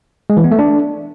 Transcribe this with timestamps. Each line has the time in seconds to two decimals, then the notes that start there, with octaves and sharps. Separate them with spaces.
0.30 G#3
0.37 E3
0.44 B3
0.51 A3
0.59 D4